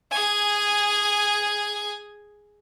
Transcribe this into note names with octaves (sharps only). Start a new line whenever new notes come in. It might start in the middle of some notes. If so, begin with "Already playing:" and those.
G#4 G#5